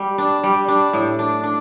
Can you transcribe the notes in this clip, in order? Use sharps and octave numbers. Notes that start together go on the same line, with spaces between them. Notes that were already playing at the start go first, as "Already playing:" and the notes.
Already playing: G3
D4
G3
D4
A2
D4
D4